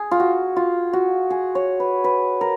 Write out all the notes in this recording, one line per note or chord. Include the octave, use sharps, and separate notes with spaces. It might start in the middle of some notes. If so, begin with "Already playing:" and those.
Already playing: G#4
F4
F#4
F4
F#4
G#4
C#5
B4
B4
A#4